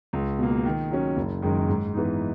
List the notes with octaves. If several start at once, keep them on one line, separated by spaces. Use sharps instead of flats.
C#2
B2 A#3
D#3
F#3 C#4
F#1
F#2 D#3 G#3
G#2
E3 B3 D#4